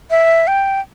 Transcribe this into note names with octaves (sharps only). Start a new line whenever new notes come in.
E5
G5